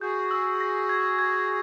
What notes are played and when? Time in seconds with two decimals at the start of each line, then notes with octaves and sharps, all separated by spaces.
0.01 F#4 G#4 G6
0.31 E6
0.60 A#6
0.89 G#6
1.19 G#6